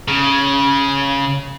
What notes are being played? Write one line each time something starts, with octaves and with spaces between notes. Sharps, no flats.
C#3